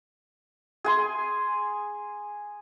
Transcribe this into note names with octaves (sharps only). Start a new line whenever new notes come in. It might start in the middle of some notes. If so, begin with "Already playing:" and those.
G#4 G#5 C6